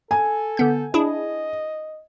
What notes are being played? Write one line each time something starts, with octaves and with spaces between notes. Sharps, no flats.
A4 G#5
D3 B3 G6
D4 E4 G#4 D#5